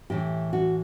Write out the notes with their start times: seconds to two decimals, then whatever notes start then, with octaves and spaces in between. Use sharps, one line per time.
0.10 A2 E3 G4
0.53 F#4